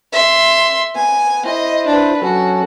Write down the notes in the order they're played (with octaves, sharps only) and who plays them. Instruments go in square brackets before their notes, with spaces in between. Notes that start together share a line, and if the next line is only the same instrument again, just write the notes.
[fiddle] E5 C6
[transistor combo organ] B3 [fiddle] G#5
[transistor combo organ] E4 C5 [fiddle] D#5
[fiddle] D4 B4
[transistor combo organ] F#3 C#4 A4 [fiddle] F#4